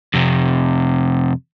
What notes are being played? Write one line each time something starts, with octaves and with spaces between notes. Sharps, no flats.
F2 C3